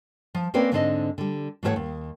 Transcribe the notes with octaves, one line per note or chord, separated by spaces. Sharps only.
F3
A#3 C4 C#4 A#4 B4 D5
G#2 D3 C4 D4 D#4 D#5
D3 G3
G#2 E3 A3 A4 C#5 F#5
D#2